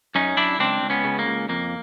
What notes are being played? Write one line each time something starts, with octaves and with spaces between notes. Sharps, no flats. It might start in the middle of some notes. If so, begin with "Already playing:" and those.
F#2 C#4 D#4
F#2 D4 E4
C#2 C4 D4
C#2
B3 C#4
C#3
A#3
C#2
F2 A#3